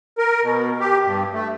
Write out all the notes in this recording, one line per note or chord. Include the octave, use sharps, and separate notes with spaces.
A#4
B2
G4
G2
A3